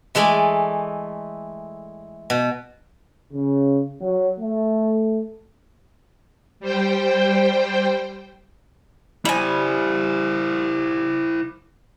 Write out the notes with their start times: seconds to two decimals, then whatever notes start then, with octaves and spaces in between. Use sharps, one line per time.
0.15 E3 G#3 A3 D5 G#5
2.30 B2
3.33 C#3
4.01 F#3
4.40 A3
6.60 G3 C5 G5
9.25 G3 E4 C5 G#5